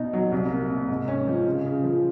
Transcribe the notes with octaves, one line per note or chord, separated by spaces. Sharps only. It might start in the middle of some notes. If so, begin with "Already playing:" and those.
Already playing: B2 D#4
F#3
C2
A#3
C3
G#2
C#4
F3
C#3
C#3
F3